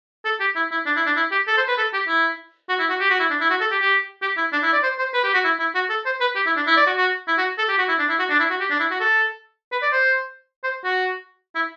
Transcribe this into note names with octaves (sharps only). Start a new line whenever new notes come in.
A4
G4
E4
E4
D4
E4
D4
E4
G4
A4
C5
B4
A4
G4
E4
F#4
E4
F#4
G4
F#4
E4
D4
E4
F#4
A4
G4
G4
G4
E4
D4
E4
D5
C5
C5
B4
G4
F#4
E4
E4
F#4
A4
C5
B4
G4
E4
D4
E4
D5
F#4
F#4
E4
F#4
A4
G4
F#4
E4
D4
E4
F#4
D4
E4
F#4
G4
D4
E4
F#4
A4
B4
D5
C5
C5
F#4
E4